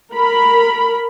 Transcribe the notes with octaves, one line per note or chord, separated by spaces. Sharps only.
A#4 B5